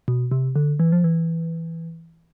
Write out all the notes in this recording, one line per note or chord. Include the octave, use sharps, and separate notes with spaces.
B2
C3
D3
E3
F3
E3